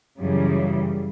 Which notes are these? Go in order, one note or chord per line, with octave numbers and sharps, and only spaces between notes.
F#2 C#3 E3 G3